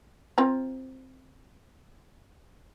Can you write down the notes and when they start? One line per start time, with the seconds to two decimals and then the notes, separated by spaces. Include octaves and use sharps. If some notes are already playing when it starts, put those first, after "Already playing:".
0.38 C4 F4 A#5